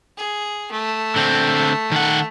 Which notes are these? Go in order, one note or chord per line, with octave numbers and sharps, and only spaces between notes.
G#4
A3
D3 C4
D#3 F#5